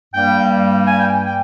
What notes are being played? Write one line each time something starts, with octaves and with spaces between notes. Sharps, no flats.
G2 G3 A#3 G5
G#5
G5
G5